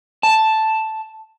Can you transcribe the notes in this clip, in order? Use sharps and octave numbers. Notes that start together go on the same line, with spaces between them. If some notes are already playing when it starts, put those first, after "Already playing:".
A5